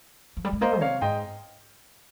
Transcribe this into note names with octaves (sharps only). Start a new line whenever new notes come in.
F3
G3
G#3
A#3 C5 D#5
C3 C#5 F5
G#2 D#5 G5